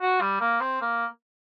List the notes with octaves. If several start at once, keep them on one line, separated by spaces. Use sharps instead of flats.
F#4
G3
A#3
C4
A#3